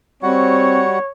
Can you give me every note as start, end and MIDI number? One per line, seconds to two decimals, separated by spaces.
0.23 0.99 55
0.23 0.82 60
0.23 0.99 66
0.23 1.10 73
0.23 0.99 78